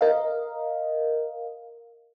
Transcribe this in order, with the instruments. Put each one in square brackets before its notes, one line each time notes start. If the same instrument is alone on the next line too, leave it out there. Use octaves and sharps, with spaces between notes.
[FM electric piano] A#4 D#5 F5